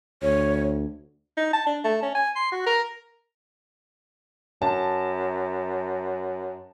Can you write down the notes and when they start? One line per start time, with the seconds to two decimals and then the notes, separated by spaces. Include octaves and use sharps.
0.22 D2 C#5
1.37 D#4
1.53 A5
1.66 D4
1.84 A3
2.02 C#4
2.15 G#5
2.36 C6
2.52 F#4
2.66 A#4
4.62 F#2 A5